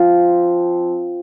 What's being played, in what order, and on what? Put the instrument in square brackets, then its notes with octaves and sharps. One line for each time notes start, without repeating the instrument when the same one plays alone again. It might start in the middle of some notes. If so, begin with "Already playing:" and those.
Already playing: [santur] F3 C4